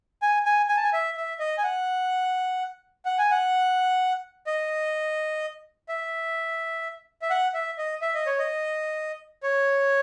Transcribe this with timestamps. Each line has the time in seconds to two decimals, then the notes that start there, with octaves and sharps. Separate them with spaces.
0.22 G#5
0.46 G#5
0.69 G#5
0.77 A5
0.84 G#5
0.93 E5
1.17 E5
1.39 D#5
1.58 G#5
1.64 F#5
3.05 F#5
3.18 G#5
3.31 F#5
4.47 D#5
5.89 E5
7.22 E5
7.30 F#5
7.54 E5
7.78 D#5
8.02 E5
8.14 D#5
8.26 C#5
8.39 D#5
9.43 C#5